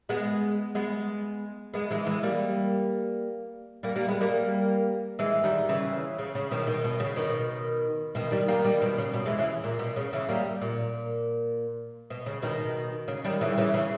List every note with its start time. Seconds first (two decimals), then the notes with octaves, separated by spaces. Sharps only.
0.09 G#3 B3
0.75 G#3 B3
1.74 G#3 B3
1.90 E3 G#3
2.06 E3 G#3
2.23 G3 A#3
3.83 G3 A#3
3.96 G3 A#3
4.08 G#3 B3
4.21 G3 A#3
5.19 E3 G#3
5.44 D#3 G3
5.69 C#3 E3
6.19 C#3
6.35 C#3
6.51 B2 D#3
6.67 B2 D#3
6.84 B2
7.00 C#3
7.16 B2 D#3
8.15 B2 D#3
8.31 D#3 G3
8.48 G3 A#3
8.64 D#3 G3
8.80 B2 D#3
8.98 C#3
9.14 B2
9.26 E3 G#3
9.38 C#3 E3
9.64 A#2
9.79 B2
9.96 C#3
10.13 C#3 E3
10.28 G3 A#3
10.61 A#2
12.10 B2
12.26 C#3
12.42 B2 D#3
13.08 C#3
13.25 D#3 G3
13.41 C#3 E3
13.58 C#3 E3
13.74 C#3 E3